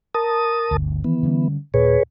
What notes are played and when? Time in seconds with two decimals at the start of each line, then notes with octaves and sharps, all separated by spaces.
0.14 A#4 A5 D#6
0.71 G1 D2
1.04 D#3 E3 B3
1.23 D3 G3 C#4
1.74 D#2 A#2 G#4 B4 C#5